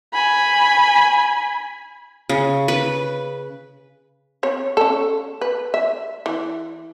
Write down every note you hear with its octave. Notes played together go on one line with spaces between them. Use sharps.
G#5 B5
C#3
B4
C4 C#5
C#4 A4
B4
E5
E3